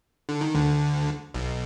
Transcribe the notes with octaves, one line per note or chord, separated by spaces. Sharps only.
D3
D#3
D2 D3
B1 B2